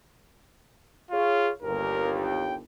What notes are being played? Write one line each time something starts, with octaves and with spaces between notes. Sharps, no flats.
F4 G#4 C#5 F5
G1 D#2 A#4
G5